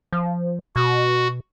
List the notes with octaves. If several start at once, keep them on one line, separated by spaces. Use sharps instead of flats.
F3
B2 F#4